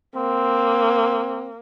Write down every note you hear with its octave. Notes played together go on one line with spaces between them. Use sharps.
A#3 C4